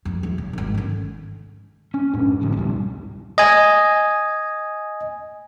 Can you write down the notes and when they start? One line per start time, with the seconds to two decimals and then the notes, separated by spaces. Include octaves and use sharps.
0.05 F2
0.23 E2
0.38 C#3
0.53 G#1 D#3
0.75 D3 C#4
1.94 C#4
2.14 F2 G#2
2.41 A1 F2 G#2 D3
2.57 C#2 B2 G3
3.38 D#5 G#5